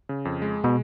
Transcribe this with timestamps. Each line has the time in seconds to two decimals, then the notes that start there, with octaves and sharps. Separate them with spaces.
0.09 C#3
0.25 F2
0.42 G#3
0.64 B2